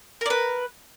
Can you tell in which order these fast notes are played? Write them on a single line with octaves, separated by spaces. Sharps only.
A#4 D5 B4